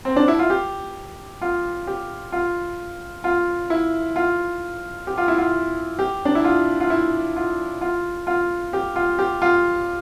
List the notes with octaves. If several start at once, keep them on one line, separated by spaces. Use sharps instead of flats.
C4
D4
E4
F4
G4
F4
G4
F4
F4
E4
F4
G4
F4
E4
F4
G4
D4
E4
F4
F4
E4
F4
F4
F4
G4
F4
G4
F4